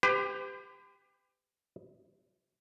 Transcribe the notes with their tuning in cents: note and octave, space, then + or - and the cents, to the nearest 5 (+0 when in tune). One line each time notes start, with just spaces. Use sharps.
G4 +20 B4 +45